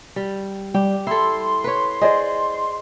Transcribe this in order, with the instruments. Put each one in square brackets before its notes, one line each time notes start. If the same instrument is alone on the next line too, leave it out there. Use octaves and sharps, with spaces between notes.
[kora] G3
[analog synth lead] G3 [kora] G4
[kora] E4 A4 [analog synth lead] C6
[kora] B4 C#5
[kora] G#4 C5 [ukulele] D5 D#5